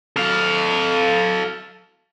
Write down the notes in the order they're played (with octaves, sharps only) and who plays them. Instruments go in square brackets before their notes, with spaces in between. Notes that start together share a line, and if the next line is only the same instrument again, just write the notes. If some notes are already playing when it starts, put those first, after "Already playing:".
[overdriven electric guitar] A4 F5